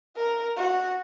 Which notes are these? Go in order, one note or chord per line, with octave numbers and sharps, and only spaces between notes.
A#4
F#4